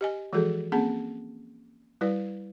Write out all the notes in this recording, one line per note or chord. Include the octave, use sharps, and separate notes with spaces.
G4 D#5 G#5
E3 F3 G#3 F#4 G#4 A4
A#3 C4 C#4 G#4 F#5 A5
G3 E4 B4 D5